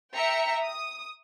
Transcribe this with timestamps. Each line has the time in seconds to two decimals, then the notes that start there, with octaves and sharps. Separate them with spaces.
0.15 E5 G5 A#5 C#7
0.64 D#6